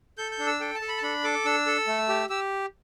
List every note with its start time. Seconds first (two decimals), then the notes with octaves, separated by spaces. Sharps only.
0.18 A4 G6
0.32 G6
0.39 D4
0.46 E6
0.60 A4 G5
0.75 A5
0.82 A4
0.88 B5
0.97 A5
1.03 D4 B5
1.24 A4 D6
1.45 D4 E6
1.66 A4
1.87 A3
2.09 G4
2.30 G4 E6